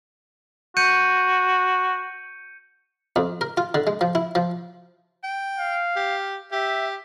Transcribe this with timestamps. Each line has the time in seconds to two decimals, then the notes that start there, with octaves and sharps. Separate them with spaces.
0.77 F#4 G6 C#7 D#7
3.16 F2
3.41 A#4
3.57 F4
3.74 D3
3.87 G#3
4.01 F3
4.15 E4
4.35 F3
5.24 G5
5.58 F5
5.96 G4
6.52 G4 E5